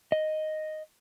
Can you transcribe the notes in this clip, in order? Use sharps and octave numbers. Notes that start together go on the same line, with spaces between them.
D#5